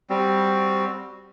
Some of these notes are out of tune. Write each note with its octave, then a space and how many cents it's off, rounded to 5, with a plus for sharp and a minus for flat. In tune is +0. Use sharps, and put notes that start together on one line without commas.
G3 +0 C4 +0 F#4 +0